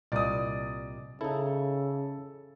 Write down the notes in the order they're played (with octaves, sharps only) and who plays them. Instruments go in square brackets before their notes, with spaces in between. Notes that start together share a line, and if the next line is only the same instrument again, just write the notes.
[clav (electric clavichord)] C2 A#2 [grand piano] D5 D#5 D#6
[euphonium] C#3 [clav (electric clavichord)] D#4 E4 [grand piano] A4